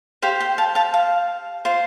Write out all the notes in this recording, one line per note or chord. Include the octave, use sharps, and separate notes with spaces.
G4 C5 F5
G5
F5 A5
F5 A5
F5
F4 C5